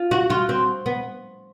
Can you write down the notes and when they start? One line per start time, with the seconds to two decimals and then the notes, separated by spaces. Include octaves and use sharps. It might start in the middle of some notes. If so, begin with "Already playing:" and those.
Already playing: F4
0.11 F#4
0.29 F4 F#4
0.49 C4
0.86 B3